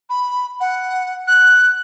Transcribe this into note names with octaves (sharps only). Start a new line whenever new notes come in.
B5
F#5
F#6